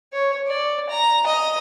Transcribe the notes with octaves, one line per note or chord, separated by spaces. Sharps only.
C#5
D5
A#5
D#5